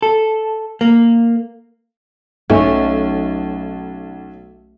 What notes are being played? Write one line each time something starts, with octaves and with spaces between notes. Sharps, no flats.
A4
A#3
B1 A3 C#4